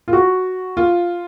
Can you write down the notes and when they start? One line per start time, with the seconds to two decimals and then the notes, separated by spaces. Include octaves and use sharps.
0.08 F4
0.13 F#4
0.77 F4